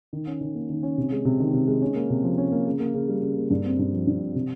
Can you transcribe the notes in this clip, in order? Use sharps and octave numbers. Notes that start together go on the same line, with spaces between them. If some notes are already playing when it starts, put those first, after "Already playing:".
D#3
C#4
D#3
A#3
D#3
C#4
C3
G#3
C3
D#3
C3
G#3
C#4
A#3
C3
F3
C#4
A#3
C#3
A#3
C#3
G3
C#3
A#3
G2
C4
G2
F3
G2
C4
C3